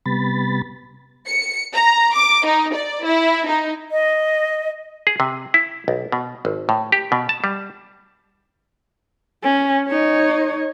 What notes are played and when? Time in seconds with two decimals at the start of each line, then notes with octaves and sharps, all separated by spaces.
0.06 C3 G3 B3 B5 A6
1.27 C#7
1.74 A#5
2.14 D6
2.45 D#4
2.74 D5
3.04 E4
3.47 D#4
3.91 D#5
5.07 G#4
5.20 C3
5.54 E4
5.88 B1
6.12 B2
6.45 G#1
6.69 A2
6.92 G4
7.12 B2
7.29 A5
7.44 G3
9.43 C#4
9.89 D#4 C#5